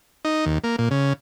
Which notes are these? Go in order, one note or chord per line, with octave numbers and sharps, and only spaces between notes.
D#4
D#2
A#3
A#2
C#3